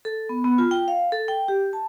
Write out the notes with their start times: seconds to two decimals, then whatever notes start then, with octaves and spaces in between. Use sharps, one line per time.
0.05 A4
0.29 B3
0.45 B3
0.58 F4
0.71 G5
0.88 F5
1.12 A4
1.28 G5
1.48 G4
1.73 A5